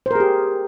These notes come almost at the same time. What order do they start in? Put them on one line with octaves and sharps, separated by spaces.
C5 A#4 G#4 G4